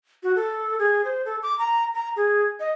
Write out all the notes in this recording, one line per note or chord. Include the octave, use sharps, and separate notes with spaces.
F#4
A4
G#4
C5
A4
D6
A#5
A#5
G#4
D#5